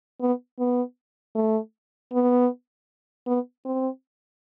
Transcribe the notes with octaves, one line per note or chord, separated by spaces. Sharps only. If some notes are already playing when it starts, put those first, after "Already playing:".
B3
B3
A3
B3
B3
C4